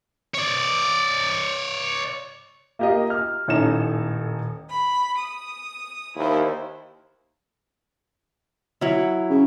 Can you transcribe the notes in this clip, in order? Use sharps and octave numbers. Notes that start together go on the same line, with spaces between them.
C#5 D5
A#3 F4 G4 A#4 D#5
F6
D#1 A2 C#4 D#4 A4 E7
B5
D#6
D#2 E4 C5
F#3 E4
C#3